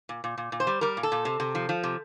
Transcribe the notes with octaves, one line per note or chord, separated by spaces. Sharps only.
A#2
A#2
A#2
A#2
C5
G3
G3 A#4
A#2
A4
A#2
C3
C3
F3
F3
C3